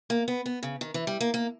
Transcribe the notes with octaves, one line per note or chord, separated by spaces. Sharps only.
A#3
B3
B3
C#3
D#3
E3
G3
A#3
A#3